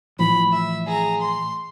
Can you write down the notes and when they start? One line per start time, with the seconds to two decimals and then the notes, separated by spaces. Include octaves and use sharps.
0.19 A2 E3 F3 B5
0.52 E5
0.87 G#4 A#5
1.21 C6